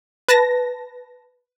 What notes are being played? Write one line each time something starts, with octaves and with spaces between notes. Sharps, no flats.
B4 A5 A#6